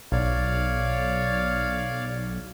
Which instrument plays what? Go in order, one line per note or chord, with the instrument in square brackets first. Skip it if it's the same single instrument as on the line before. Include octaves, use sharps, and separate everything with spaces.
[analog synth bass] B1 [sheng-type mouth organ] C#5 D5 F5